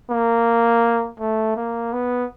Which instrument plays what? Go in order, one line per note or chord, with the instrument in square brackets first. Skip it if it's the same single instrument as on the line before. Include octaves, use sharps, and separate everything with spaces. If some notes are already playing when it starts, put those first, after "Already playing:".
[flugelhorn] A#3
A3
A#3
B3